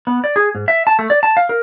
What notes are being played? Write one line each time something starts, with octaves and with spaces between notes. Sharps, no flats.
B3
D5
G#4
G#2
E5
A5
A3
D5
A5
F5
A#4